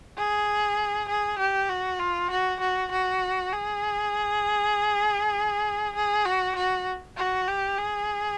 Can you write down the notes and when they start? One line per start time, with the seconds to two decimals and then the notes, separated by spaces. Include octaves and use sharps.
0.17 G#4
1.08 G#4
1.38 G4
1.69 F#4
1.99 F4
2.30 F#4
2.60 F#4
2.91 F#4
3.52 G#4
5.95 G#4
6.26 F#4
6.55 F#4
7.17 F#4
7.48 G4
7.78 G#4